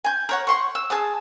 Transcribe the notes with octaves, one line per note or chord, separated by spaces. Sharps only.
G#5 G6
A#4 C#5 F#5
F#5 C6 C#6
E6
G#4 A5 D#6